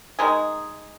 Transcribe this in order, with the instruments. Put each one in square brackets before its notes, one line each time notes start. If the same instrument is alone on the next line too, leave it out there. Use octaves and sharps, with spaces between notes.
[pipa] D#3 G#3 D#4 G#4